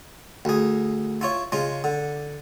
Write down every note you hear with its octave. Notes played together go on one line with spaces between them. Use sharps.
D2 G#4
E4 F4 C#5
C#3 G#3 F4
D3